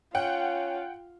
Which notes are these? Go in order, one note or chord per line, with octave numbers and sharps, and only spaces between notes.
C#4 F4 F#5 G5